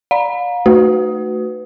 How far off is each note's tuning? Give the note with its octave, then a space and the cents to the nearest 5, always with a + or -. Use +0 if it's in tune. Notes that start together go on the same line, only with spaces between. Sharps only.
D5 +0 F5 +35 A#5 +25
A3 +5 F#4 +0 B4 +20